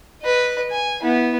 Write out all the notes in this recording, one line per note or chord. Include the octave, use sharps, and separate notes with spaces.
B4 D#5
G#5
B3 E4